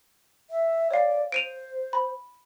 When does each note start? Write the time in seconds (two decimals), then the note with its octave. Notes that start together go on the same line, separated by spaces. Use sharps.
0.50 E5
0.91 C#5 D5 F5
1.32 C5 D7 D#7 F7
1.93 B5